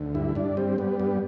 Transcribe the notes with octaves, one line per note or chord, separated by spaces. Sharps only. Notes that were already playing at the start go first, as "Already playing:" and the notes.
Already playing: D2
G2 E4
G2 D4
G3 C4
G3 B3
G2 B3